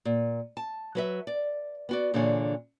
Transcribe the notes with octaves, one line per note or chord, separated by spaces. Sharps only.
A#2
A5
F#3 B4 E5
D5
B3 F#4 D5
A#2 D3 E3 D4 G#4 C#5